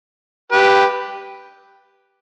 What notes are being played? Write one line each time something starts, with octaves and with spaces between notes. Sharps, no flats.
G4 B4